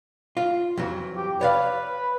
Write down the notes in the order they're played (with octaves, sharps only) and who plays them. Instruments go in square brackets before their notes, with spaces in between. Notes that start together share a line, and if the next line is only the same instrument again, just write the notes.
[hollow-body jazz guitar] F4
F2 E3 F#3
[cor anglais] G4
[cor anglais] B4 [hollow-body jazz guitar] C#5 D5 F5